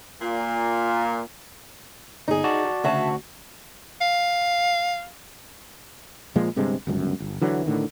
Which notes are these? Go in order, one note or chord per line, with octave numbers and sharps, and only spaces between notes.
A#2
G1 D#4 G#4
F#4 D5 A5
D2 C#3 F#4 E5 A5
F5
A#2 F3 G#3
G1 G2 C3 G#3
G1 C#2 F#2
G1
D3 E3 F#3
A2 D3 D#3